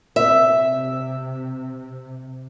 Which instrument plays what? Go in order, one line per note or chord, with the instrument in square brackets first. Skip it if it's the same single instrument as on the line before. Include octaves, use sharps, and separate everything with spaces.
[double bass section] C3 [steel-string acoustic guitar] E5